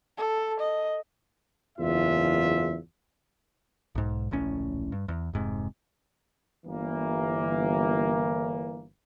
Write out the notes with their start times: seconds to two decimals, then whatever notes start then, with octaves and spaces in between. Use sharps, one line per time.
0.18 A4
0.60 D#5
1.79 F#1 E2 G#2 F4 E5
3.95 B1 G#2
4.31 D1 A#1 A2 C#4
4.92 G2
5.08 E2
5.33 F1 G#2 C3
6.66 G1 E3 A#3